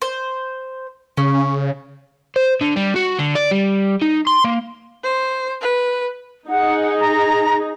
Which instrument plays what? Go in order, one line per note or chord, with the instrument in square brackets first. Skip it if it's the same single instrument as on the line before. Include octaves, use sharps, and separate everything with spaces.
[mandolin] C5
[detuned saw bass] C#3 [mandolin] C#4
[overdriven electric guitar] C5
D3
G3
F#4
D3
D5
G3
D#4
C6
A#3
[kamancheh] C5
B4
[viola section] D#4 G#4 [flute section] F#5
[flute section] A#5